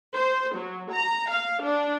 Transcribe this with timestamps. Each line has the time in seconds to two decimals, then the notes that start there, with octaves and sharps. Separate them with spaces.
0.13 C5
0.54 F#3
0.92 A#5
1.30 F5
1.62 D4